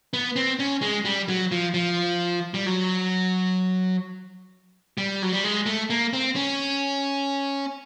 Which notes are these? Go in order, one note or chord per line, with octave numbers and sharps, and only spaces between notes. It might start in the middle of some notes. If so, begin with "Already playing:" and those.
B3
C4
C#4
G#3
G3
F#3
F3
F3
G3
F#3
G3
F#3
G3
G#3
A3
A#3
C4
C#4